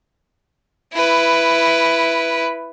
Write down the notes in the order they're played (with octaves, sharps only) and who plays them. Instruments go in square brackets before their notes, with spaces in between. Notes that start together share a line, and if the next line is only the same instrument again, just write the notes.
[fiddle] E4 B4